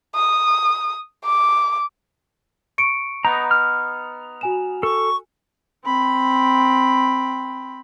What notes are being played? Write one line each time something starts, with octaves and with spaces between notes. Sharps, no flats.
D#6
D6
C#6 C#7 D7
B3 D#4 A#5
F6
F#4 G#5 E7
A4 C#6
C4 B5